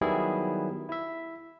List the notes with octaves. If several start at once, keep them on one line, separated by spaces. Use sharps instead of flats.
D#3 F#3 G3 B3 E4 G#4
E4 E5